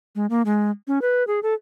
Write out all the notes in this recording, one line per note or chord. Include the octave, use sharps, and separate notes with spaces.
G#3
A#3
G#3
C#4
B4
G#4
A4